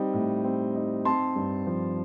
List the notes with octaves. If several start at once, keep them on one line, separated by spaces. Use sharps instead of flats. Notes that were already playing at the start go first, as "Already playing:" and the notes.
Already playing: G3 C4 D#4
A2
C4
D#4
C4 A5 C6
G2
F3